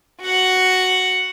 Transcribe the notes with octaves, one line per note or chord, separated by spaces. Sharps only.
F#4 F#5